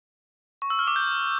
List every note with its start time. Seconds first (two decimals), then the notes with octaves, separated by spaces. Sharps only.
0.62 C#6
0.70 E6
0.79 F6
0.87 D6
0.96 G6